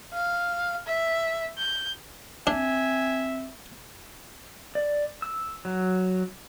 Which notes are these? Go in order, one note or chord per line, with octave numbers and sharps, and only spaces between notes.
F5
E5
G6
C4 D4 E5 G#5
D5
E6
F#3